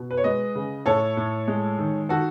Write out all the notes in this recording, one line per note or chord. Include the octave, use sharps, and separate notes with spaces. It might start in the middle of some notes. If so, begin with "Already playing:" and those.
Already playing: B2
B4
C#5
G#3 B4 D#5
C#3
A2 A4 C#5
A2
G#3
D#3
D#3 F#4 A4